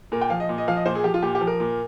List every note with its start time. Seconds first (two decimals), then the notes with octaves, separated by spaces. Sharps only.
0.12 A#2 A#4
0.22 G5
0.30 F3 F5
0.40 D#5
0.49 A#2
0.58 D#5
0.68 F3 F5
0.77 D#5
0.86 A#2 C5
0.95 G#4
1.04 F3 G4
1.14 F4
1.23 A#2 G4
1.35 G4
1.41 F3
1.47 A#4
1.60 A#2